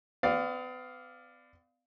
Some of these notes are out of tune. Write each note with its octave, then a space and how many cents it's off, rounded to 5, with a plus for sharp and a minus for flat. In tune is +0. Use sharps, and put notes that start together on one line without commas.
B3 +40 D5 +10 F5 +0